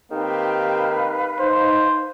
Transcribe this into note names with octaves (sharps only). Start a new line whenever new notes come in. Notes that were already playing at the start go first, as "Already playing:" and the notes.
D#3 A#3 C4 G4 B4 F5
D#4 C5